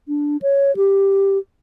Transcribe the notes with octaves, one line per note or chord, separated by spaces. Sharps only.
D4
C#5
G4